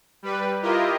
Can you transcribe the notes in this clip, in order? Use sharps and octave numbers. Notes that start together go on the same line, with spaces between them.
G3 B4
E4 F4 G4 A#4 D#5